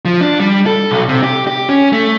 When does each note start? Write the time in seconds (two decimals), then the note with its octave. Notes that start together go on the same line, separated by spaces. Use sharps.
0.05 F3
0.21 D4
0.40 G3
0.66 A4
0.90 B1
1.09 C3
1.23 G4
1.47 G4
1.69 C#4
1.93 A3